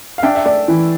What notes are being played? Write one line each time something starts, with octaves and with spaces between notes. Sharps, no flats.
F5
D4 E5 G5
E5
A3 D5
E3